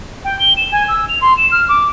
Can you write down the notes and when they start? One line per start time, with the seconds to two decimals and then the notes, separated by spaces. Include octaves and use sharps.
0.25 G5
0.39 G7
0.57 E7
0.72 G#5
0.88 E6
1.09 F7
1.21 C6
1.37 E7
1.51 F6
1.69 D6